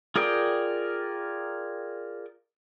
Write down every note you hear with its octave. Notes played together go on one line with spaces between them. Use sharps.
F4 G#4 A#4 D5 G5